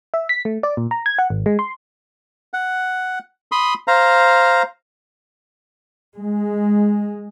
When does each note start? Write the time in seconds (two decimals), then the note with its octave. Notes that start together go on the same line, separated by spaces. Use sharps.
0.14 E5
0.29 B6
0.45 A3
0.63 D5
0.77 A#2
0.91 A#5
1.06 G#6
1.18 F#5
1.30 G#1
1.46 G#3
1.59 C6
2.54 F#5
3.52 B5 C6 D#6
3.88 C5 F5 A#5
6.16 G#3